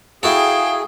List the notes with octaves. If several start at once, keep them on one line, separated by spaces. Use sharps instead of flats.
E4 F#4 G#4 A4 F5 G5